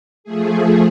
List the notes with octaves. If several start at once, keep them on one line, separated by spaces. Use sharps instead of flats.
F3 A3 G#4